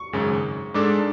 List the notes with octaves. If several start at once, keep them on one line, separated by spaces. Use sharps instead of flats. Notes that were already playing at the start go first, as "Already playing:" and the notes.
Already playing: C#6
G#1 F#2 C#3 G#3
G#2 G#3 D4 A4 D6